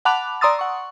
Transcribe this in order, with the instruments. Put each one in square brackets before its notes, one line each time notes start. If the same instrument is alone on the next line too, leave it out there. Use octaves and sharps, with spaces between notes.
[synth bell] F#5 A5 B5 D6 F#6 F7
D5 A#5 C6 D#6 E6 A6
F#5 C#6